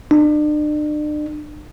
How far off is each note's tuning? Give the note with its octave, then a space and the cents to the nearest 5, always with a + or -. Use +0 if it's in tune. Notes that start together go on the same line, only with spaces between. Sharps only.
D4 +40